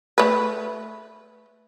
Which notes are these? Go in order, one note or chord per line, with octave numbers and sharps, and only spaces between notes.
A3 B4